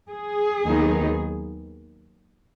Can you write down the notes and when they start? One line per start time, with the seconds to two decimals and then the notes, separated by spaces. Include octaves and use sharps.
0.10 G#4
0.65 D#2 D#3 F#3 B3 D#4